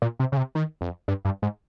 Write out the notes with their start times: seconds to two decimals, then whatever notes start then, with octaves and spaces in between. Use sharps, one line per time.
0.02 A#2
0.19 C3
0.32 C#3
0.37 C3
0.55 D#3
0.81 F2
1.08 G2
1.25 G2
1.42 G#2